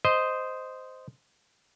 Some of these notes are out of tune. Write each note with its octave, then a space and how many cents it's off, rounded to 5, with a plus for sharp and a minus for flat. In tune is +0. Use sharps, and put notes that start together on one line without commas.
C5 -10 D#5 +0